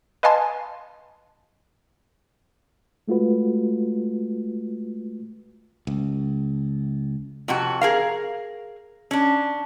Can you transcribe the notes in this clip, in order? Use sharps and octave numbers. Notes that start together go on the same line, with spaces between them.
B4 D#5 F5 G#5 A5 C6
G#3 A3 F4 F#4 B4
C#2
F2 C3 F#4
G#4 A#4 F5
C#4 D4